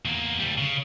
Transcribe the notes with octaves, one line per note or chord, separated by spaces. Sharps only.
E2 A#3
D2 G3
C#3